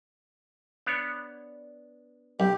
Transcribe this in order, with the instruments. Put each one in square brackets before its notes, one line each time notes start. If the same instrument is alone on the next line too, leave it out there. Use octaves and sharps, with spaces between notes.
[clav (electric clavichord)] B3 D4 C#5
[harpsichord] B1 [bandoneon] G4